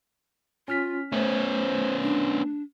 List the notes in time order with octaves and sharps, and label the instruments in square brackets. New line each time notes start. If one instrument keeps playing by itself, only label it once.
[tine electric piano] C#4 F6 B6 [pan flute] F4
[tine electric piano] A3 [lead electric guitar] B3 C#4 [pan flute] C5
[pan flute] D4